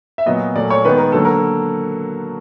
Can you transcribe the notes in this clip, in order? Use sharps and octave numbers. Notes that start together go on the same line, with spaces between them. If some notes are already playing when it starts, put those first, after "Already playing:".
E5
A#2 F#3 B3 D#5
A#2 F#3 A3 D5
C#5
D#3 G#3 B3 B4
A#4
D3 F#3 A#3 A4
A#4